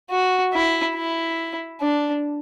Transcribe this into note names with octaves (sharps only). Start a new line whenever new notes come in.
F#4
E4
E4
D4